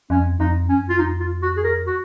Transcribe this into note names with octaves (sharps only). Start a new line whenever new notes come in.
F2 C#4
F2 D#4
F#2 C#4
F4
F2 D#4
F4
F#4
G#4
A#4
F#4